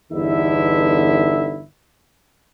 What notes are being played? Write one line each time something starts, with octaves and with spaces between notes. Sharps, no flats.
G1 E2 D3 D#4 E4 E5